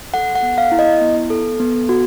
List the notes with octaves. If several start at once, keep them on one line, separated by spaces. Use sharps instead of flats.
A4 F#5
F#5
B3
F5
E4
D#5
B3
A4
B3
F#4